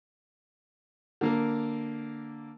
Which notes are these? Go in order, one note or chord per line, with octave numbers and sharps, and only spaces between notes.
D3 A#3 A#4